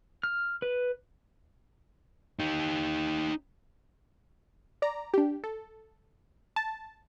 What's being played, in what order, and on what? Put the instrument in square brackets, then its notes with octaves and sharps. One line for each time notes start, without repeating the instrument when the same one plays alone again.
[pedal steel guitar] F6
B4
[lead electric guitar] D#4 G4
[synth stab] D5 A#5
D4 G4
A4
A5